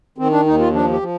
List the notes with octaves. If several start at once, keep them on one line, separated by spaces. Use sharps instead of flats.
D#3 C4
D4
D#2 D#4
F4
F3 D4
G4
F3